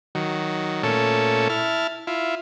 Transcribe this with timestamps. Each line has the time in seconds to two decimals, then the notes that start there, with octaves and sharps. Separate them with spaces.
0.15 D#3 F#3
0.83 A#2 A3 C#4 A4
1.49 E4 A5 F6
2.07 E4 F4